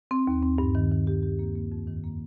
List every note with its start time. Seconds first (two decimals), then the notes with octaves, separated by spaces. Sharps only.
0.11 C4
0.27 D#2
0.42 C4
0.58 G2
0.75 D#3
0.92 D#3
1.07 G4
1.23 G4
1.39 A#3
1.55 A#3
1.72 F2
1.87 D#3
2.04 A#3